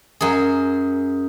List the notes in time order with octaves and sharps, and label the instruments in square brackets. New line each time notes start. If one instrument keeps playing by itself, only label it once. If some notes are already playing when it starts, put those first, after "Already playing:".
[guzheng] F#2 G#4